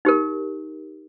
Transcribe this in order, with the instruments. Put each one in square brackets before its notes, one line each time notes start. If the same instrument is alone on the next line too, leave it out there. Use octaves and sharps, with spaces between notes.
[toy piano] D#4 G4 A#4